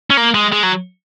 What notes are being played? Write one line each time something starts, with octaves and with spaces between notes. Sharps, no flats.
C#4
A#3
G#3
G#3
F#3